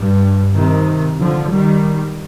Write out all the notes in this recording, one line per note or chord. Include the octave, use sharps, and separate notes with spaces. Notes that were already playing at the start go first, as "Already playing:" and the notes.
Already playing: G2
C3 D#3
D3 F3
D#3 G3